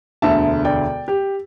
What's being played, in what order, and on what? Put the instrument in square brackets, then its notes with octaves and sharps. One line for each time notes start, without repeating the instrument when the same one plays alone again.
[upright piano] E1 D2 D3 E5 A5
D5 G5
G4